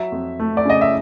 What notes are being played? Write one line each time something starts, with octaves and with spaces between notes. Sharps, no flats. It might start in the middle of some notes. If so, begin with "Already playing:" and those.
Already playing: F#3 E5
F2
A3
D5
C#3 D#5
E5